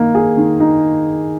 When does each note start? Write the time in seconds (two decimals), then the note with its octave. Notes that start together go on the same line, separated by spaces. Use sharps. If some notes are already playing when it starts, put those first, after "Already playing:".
Already playing: D#3 A#3 D#4
0.15 G#4
0.37 D#3
0.60 D#4